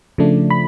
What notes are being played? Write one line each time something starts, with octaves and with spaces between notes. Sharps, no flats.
C#3 F3 A3 D4
B5